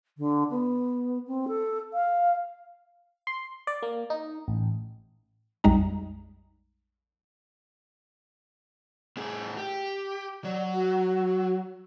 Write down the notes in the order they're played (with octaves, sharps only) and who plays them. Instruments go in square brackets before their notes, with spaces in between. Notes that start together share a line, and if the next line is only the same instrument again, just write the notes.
[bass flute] D3
B3
C4
A4
F5
[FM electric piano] C6
D5
A#3
D#4
A1
[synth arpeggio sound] A#1 F2 G3 G#3 D#4 A#5
[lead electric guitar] A2 G#4
G4
[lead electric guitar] F#3 [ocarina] D5
[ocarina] F#4